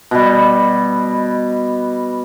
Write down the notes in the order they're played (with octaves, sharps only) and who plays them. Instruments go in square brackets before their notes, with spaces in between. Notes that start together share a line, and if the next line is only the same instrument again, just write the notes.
[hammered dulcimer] B2 G3